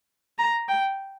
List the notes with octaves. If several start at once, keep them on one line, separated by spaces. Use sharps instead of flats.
A#5
G5